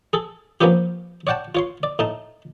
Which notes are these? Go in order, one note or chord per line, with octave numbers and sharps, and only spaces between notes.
G#4 A4
F3 A#3 B3 C#4 F4 G4
C#5 D5 F#5 G5 A5
F4 C#5 C6
D5
A2 D#4 A5